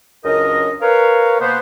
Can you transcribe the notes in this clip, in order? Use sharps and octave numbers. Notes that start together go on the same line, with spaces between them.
C#2 F#2 D4 A#4 D#5
A#4 B4 C#5 F5
B2 A#3 B3 C5